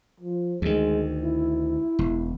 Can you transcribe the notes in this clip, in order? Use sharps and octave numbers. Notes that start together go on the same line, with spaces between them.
F3
D2 D#3 G#3
E4
E1